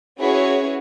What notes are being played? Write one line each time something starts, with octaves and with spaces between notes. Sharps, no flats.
C#4 E4 F#4 G#4 B4 C#5